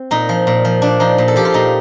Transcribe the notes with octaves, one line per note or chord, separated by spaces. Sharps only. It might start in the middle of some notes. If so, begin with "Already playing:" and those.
Already playing: C4
A#2 D#4
F3
A#2
F3
A#2 D4
F3 D#4
A#2
A4
F3 G4
F4
A#2 D#4